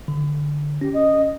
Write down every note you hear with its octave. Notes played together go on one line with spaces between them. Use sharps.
D3
C#4 G4
D#5